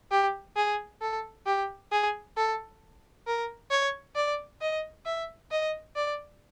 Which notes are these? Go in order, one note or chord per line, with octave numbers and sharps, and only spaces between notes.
G4
G#4
A4
G4
G#4
A4
A#4
C#5
D5
D#5
E5
D#5
D5